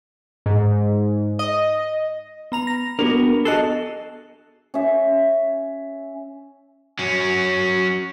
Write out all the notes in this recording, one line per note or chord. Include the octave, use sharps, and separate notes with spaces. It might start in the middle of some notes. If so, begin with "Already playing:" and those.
G#2
D#5
B3 A#5 F7
A#6
B3 D4 F#4 A#4
F#4 G#4 A4 D#5 F#6 C7
C#4 E5
F#3 C#4